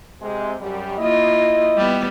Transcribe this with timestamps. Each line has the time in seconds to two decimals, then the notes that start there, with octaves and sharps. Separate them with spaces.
0.22 C3 G#3
0.61 F#2 G3
0.99 A#3 E4 F4 D#5
1.77 G3 B3